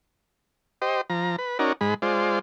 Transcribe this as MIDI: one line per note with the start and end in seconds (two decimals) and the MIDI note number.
0.82 1.01 67
0.82 1.01 72
0.82 1.01 75
1.10 1.36 53
1.10 1.36 82
1.38 1.58 71
1.59 1.73 61
1.59 1.73 63
1.59 1.73 66
1.59 1.73 70
1.59 1.73 74
1.81 1.94 44
1.81 1.94 56
1.81 1.94 83
2.02 2.39 56
2.02 2.39 65
2.02 2.39 72
2.02 2.39 74